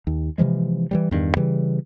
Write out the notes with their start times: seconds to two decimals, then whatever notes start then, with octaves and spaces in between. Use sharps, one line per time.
0.07 D#2
0.38 C3 E3 F3 G#3
0.91 E3 F#3 G3
1.11 E2 G2 D#3
1.37 C#3 E3 G3